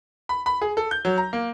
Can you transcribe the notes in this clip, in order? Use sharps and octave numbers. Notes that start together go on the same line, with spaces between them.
B5
B5
G#4
A4
G6
F#3
A#5
A#3